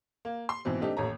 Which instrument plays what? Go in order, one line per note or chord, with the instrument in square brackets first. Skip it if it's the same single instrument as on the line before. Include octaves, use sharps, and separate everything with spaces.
[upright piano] A#3
C6
G#2 B2 E3 C4
A3 C4 D4 D#4 G4
A1 D#2 A3 C#5 A#5